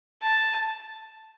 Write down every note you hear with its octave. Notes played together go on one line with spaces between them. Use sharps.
A5